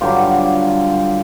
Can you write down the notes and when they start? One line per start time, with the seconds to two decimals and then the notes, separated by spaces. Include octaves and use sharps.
0.01 G2 D3 F#3 F4 G4